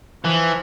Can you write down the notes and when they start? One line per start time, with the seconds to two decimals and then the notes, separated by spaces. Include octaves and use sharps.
0.24 E3 F3